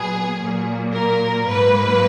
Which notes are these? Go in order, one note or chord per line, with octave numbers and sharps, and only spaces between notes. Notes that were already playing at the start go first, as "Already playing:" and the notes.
Already playing: A#2 F#3 B3 G#4
A#2 F#3 A#3
A#4
G#2 F#3 A#3 B4